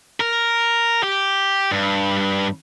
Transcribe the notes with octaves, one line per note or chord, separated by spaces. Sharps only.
A#4
G4
G2